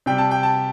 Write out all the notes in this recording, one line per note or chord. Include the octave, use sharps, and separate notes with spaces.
C3 G3 G5
A5
G5
A5